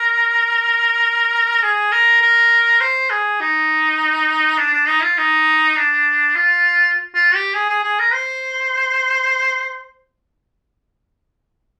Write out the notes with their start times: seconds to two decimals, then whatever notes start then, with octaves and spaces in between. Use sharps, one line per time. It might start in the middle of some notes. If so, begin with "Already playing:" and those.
Already playing: A#4
1.62 G#4
1.92 A#4
2.22 A#4
2.81 C5
3.10 G#4
3.41 D#4
4.58 D4
4.74 D4
4.88 D#4
5.03 F4
5.18 D#4
5.76 D4
6.35 F4
7.14 F4
7.35 G4
7.54 G#4
7.69 G#4
7.84 G#4
7.99 A#4
8.14 C5